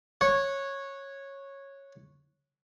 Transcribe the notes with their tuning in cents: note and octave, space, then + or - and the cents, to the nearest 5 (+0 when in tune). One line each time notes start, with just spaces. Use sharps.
C#5 -10 F#5 -10